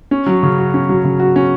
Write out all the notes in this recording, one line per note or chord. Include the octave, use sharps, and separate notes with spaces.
C#4
F#3
C#3
F#4
C#4
F#3
C#3
F#4
C#4